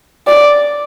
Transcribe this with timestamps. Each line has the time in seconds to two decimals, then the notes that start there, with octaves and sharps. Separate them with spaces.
0.27 D5